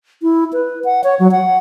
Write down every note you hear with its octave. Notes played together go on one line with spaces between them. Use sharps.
E4
B4
F#5
C#5
F#3
F#5